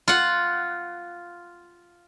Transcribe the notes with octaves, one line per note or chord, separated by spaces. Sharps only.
F4 F#5